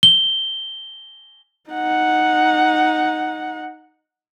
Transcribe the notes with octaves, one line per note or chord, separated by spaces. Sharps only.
G7
D#4 F#5